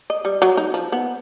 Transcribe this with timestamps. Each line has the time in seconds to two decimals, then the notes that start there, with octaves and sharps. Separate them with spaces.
0.10 D#5
0.25 G3
0.42 F#3
0.57 D#4
0.74 F3
0.92 B3